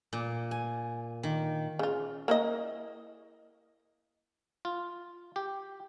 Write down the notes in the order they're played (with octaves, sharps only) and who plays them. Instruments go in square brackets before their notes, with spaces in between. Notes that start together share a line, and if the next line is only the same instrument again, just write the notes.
[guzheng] A#2
G#5
D#3
[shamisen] C#3 F4
A#3 E4 D#5
[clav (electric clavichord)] F4
G4